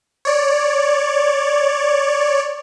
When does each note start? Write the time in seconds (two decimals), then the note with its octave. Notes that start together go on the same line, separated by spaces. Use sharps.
0.25 C#5 D5